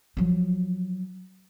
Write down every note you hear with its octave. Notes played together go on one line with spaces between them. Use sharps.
F3 F#3